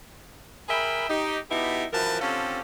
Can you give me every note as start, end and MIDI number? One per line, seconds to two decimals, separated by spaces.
0.69 1.08 68
0.69 1.08 70
0.69 1.08 76
0.69 1.08 79
0.69 1.08 83
1.09 1.37 63
1.09 1.37 67
1.50 1.84 47
1.50 1.84 59
1.50 1.84 63
1.50 1.84 64
1.50 1.84 67
1.92 2.19 42
1.92 2.19 52
1.92 2.19 53
1.92 2.19 70
1.92 2.19 71
1.92 2.19 81
2.21 2.61 50
2.21 2.61 60
2.21 2.61 61
2.21 2.61 65
2.21 2.61 67
2.21 2.61 69